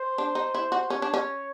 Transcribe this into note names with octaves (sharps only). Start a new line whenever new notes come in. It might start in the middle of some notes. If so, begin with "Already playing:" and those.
Already playing: C5
D4
D#4
E4
F#4
C#4 C#5
D4
C#4